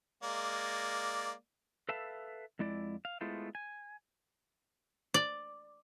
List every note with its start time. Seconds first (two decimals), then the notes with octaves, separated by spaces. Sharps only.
0.23 G#3 A#3 D5
1.89 A4 B4 E5 F5 A5
2.59 F2 G#3 E4 D5
3.05 F5
3.21 G#3 A3 B3 E4 F4 C5
3.55 G#5
5.14 D5